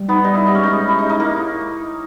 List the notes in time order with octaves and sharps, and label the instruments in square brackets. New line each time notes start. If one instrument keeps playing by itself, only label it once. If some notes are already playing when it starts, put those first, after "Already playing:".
Already playing: [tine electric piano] G3
[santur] B3 [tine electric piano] D#4
[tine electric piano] G3 [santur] D#4
[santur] E4
[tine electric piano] G4
[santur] D#4
[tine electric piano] G#3 [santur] C#4
[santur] D#4
[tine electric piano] G#3
[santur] E4 [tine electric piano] G4
[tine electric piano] G#3 [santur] D#4
[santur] D#4
[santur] A#3 [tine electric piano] E4